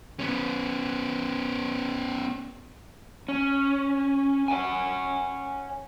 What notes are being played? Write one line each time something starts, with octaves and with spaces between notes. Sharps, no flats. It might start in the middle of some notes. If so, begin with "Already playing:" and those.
B3 C#4
C#4
C#5 D5 F#5 G#5